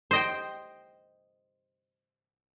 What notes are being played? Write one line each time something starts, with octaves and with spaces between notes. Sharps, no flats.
C5 D#5 G5